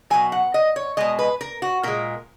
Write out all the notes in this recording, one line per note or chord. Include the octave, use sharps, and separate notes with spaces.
B2 F#3 G#5
F#5
D#5
C#5
B2 G#3 D#5
B4
A#4
F#4
A#2 G#3 A#4